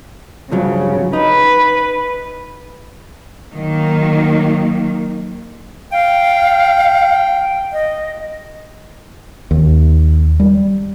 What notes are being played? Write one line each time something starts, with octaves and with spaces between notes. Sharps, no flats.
G2 C#3 F3 F#3
D#4 B4
D#3 F#3 A#3
F5 G5
D#5
D#2
G3